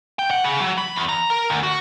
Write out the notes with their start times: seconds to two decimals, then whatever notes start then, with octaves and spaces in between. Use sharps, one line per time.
0.19 G5
0.31 F#5
0.44 C#3
0.61 F#3
0.78 B5
0.95 E2
1.09 A#5
1.30 A#4
1.50 D2
1.63 F#4